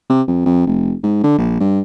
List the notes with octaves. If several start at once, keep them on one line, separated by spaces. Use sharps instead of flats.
C3
F2
F2
F1
G#2
D3
A#1
G2